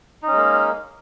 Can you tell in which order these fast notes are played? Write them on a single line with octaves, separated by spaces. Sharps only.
D#4 C#4 G#3 A#3